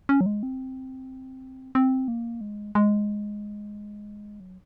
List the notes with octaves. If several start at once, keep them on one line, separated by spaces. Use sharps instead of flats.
C#4
F#3
G#3
C4
C4
A#3
G#3
G#3
F#3